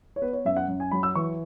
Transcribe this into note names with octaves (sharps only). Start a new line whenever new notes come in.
C#5
B3 B4
C#5
F#2 E5
F#5
F#2
G#5
F#3 B5
E6
E3 C#6